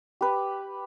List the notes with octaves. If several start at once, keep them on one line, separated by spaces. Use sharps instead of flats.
G4 B4